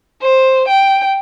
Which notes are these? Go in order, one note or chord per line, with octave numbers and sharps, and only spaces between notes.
C5
G5